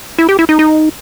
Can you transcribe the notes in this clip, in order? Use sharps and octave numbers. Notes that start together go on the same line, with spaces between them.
E4
G4
E4
D#4
D#4